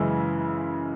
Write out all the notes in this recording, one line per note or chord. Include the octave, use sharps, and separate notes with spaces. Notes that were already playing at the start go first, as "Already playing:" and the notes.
Already playing: F#2 C#3 E3 G#3 E4